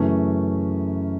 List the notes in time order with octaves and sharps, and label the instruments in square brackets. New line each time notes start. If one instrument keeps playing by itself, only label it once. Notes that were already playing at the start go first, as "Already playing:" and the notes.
Already playing: [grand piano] F#2 C#3 E3 A3 C#4